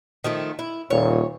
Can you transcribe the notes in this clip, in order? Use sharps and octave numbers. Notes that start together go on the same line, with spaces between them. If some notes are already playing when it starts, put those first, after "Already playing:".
D#3 F3 A3
E4
D#1 A#2 C#5